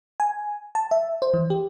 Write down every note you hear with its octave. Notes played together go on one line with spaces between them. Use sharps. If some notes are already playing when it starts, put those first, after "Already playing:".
G#5
A5
E5
C5
E3
G4